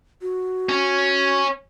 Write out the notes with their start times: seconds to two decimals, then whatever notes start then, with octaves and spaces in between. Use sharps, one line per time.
0.22 F#4
0.69 C#4